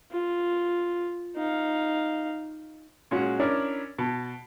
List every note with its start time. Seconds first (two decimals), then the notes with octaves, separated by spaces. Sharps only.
0.12 F4
1.36 D#4 F5
3.11 A#2 G#3 C#4 F#4
3.40 C#4 D4 E4 A#4 C#5 D5
3.98 B2 A5